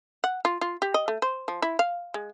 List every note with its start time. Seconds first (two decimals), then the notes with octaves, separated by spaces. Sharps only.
0.24 F#5
0.45 F4
0.61 F4
0.82 G4
0.94 D#5
1.08 A3
1.22 C5
1.48 F3
1.62 E4
1.79 F5
2.14 G#3